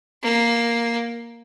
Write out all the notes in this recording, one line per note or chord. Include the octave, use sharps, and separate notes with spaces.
A#3